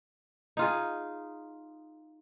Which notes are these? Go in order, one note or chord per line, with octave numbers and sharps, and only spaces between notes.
D#4 F4 G#4